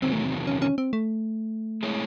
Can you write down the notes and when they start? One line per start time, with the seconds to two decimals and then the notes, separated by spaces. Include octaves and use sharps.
0.02 E2 C3 D#3 F#3 C4
0.13 A3
0.24 C4
0.47 C#4
0.62 C#4
0.78 C4
0.93 A3
1.83 G#3 C4 E4 G#4 C#5